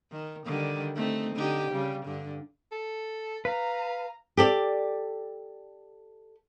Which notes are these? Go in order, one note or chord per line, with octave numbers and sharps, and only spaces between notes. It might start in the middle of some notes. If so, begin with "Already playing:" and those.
D#3
D3 D#3 G3
A3 C4 D#4
D3 D#4 G4
C#3 G3
G2 D3
A4
B4 F5 A#5
G4 A4 D5